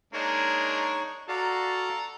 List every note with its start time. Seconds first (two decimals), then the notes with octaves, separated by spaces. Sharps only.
0.13 G#3 A#3 D4 D#4 C#5 C#6
1.28 F#4 A4 D5 F5 A#5